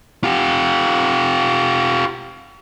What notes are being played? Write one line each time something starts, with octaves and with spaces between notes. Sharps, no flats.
F4 G4